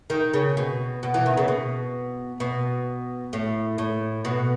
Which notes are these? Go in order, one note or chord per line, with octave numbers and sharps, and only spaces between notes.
D#3
C#3
B2
B2
E3
D#3
C#3
B2
B2
A2
A2
B2